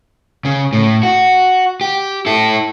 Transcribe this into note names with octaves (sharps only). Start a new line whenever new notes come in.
C#3
A2
F#4
G4
E4 A4